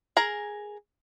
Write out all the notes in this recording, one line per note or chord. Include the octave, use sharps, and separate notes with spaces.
G#4 A#4 A#5